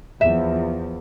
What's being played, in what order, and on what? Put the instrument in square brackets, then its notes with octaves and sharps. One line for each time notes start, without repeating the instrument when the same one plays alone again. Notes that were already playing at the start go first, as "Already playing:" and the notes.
[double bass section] E2 F3 [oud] E5